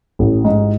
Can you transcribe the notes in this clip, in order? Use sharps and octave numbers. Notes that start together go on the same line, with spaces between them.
A1
G#2